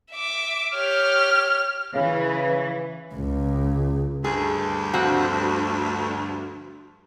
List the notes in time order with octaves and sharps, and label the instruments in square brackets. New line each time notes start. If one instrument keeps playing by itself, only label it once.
[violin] E5 D6
[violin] G4 C#5 [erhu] F6
[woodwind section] C#3 [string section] E3
[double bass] C#2
[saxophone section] D2 G2 [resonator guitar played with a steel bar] G#4
[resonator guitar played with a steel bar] F3 C4 F#4